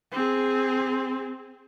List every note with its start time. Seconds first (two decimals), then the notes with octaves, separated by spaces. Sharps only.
0.12 C4 G#4